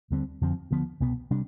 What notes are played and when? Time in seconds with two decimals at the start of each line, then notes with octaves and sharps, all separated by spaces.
0.10 D#2 D3 G3 C4
0.41 F2 D3 F3 C4
0.71 D2 D3 F3 B3
1.00 C2 B2 B3
1.31 C3 G3 D4